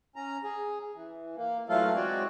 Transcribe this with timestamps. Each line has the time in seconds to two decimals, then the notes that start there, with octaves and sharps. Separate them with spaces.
0.16 C#4 A#5
0.44 G#4
0.95 E3
1.37 A#3
1.69 E3 F#3 A3 F4 A4 F5
1.95 G#3 C4 F#4 C#5 D5